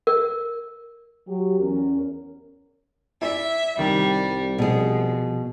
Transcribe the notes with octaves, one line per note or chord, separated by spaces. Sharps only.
A#4
F#3 G4
E2 C#4 A#4
E4 D5 E5
C2 D#3 G3
B2 F3 G#4